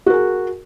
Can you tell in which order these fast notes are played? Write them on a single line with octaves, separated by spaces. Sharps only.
F#4 A#4 G#4